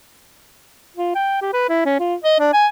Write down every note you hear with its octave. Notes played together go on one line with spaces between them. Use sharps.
F4
G5
G4
B4
E4
C#4
F4
D#5
D4
G#5